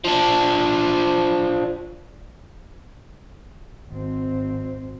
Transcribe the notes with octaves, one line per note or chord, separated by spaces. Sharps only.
F3 D4
G#1 C4